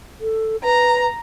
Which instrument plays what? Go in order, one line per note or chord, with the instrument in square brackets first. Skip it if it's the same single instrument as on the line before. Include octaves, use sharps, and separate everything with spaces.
[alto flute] A4
[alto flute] B4 [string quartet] A#5